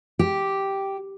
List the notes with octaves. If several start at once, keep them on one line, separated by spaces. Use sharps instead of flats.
G4